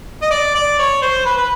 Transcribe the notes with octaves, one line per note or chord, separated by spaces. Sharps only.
D#5
D5
D5
C#5
C5
B4
B4